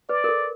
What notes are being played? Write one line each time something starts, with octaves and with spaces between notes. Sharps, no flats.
B4 D5
A#4
A4